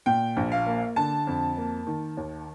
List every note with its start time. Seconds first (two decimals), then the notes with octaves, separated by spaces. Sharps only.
0.06 A#2 G5
0.37 A#1
0.52 F5
0.66 A#3
0.96 D3 A5
1.27 F2
1.57 A#3
1.87 D#3
2.17 D#2